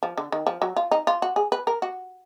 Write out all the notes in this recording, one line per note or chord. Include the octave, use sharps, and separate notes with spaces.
F3
D3
D#3
F3
F#3
F4
D#4
F4
F#4
G#4
B4
A#4
F#4